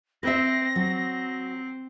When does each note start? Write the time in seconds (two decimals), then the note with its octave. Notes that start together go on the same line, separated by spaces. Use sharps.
0.23 C4 B4 E5 A#6
0.76 F#3 C4